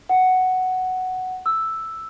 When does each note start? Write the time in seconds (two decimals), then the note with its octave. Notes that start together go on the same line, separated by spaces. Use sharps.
0.09 F#5
1.46 E6